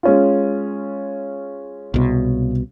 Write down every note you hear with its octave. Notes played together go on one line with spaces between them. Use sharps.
G#3 C#4 F4
C2 B2